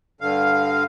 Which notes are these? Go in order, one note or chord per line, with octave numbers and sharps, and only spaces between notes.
G2 D3 F5